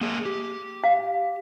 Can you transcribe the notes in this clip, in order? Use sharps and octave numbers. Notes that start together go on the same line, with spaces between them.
A#3 G#4
G4
F5